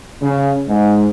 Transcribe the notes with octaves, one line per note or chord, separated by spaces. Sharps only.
C#3
G#2